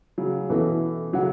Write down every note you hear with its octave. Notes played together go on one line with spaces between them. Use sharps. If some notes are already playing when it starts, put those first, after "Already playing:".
C#3 F#3
B2 E3 C#4 E4 A4
C#3 F#3 C#4 A4 F#5